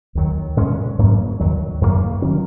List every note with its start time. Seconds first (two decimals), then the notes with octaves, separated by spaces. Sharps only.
0.15 D#2 D#3 F#3
0.57 A#2 G#3 C#4
0.99 G#2 F#3 A#3 C#4
1.40 D#2 D#3 F#3
1.81 F#2 D#3 F#3 A#3
2.22 D#3 F#3 C#4